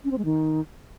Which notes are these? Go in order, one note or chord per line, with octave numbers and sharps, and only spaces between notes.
C#4
C4
G#3
D#3